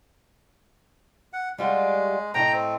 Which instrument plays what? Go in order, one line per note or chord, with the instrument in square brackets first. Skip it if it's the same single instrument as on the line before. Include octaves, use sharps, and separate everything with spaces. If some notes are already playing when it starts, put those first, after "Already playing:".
[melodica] F#5
[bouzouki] G3 F4 F#4 [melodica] G#3
[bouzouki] A2 A3 D#4 [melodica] G5 A#5
[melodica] C4